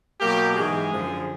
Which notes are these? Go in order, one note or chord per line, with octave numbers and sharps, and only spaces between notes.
B2 F#3 A#3 G4
G#2 E3 G#3 G#4
F#2 D3 F3